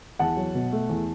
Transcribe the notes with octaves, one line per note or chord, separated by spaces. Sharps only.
E2 F#5 A5
F#3
B2
A3
E2